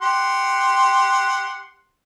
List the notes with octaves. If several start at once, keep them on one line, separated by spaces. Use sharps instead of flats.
G4 F#5 C6